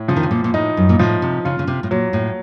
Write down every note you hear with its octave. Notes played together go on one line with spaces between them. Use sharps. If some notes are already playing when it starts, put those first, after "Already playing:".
Already playing: A2
C#3 F3
D#3
C#3
A#2
A#2
A2 D#4
F#2
A#2
A2 F3
C3
C#3 F4
C#3
C3
A2
A#2 F#3
A2